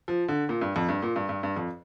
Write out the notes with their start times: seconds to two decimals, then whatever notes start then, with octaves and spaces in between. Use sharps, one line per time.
0.08 F3
0.28 D3
0.49 A#2
0.61 G2
0.76 F2
0.89 G2
1.02 A#2
1.16 G2
1.29 G2
1.43 G2
1.56 F2